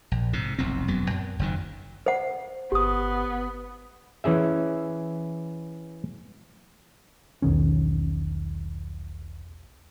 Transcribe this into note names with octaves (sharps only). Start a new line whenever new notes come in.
A#1
G#2 C3
F1 B1 E2 C4
E1 F#2 F#3 B3
F#2
F#1 F#2 D#3
C5 F#5
G1 B3 G4 D#6
E3 C#4 G#4 E5
E1 B1 D#3 C#4